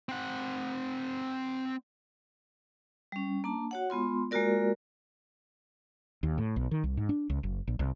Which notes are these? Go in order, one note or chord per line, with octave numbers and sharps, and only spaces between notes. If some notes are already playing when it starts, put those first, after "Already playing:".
C4 F#5
G3 C#4
A#3 D4 A5
F#4 C#5 F#5
G#3 B3 F4 C6
G#3 A#3 F4 F#4 A#4 D5
D#2
A2
B1
D#3
C2
G#2
D4
C#2
F#1
A#1
C2